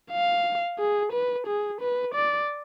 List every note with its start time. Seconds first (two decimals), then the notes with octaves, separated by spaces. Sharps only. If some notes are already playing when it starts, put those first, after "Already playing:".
0.11 F5
0.79 G#4
1.12 B4
1.47 G#4
1.81 B4
2.14 D5